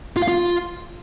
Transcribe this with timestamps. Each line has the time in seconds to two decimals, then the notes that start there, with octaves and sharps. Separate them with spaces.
0.16 F4
0.22 F5
0.28 F4